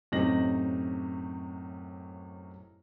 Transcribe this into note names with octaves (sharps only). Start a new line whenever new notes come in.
F#2 A2 C3 D#4 A#6 F#7